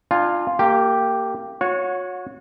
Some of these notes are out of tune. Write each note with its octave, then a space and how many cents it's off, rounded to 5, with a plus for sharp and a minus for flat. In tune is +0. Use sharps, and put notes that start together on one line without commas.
D4 +35 F4 +0 G#5 +0
A#3 -25 G4 +0
F#4 -35 C#5 +0 F#5 -25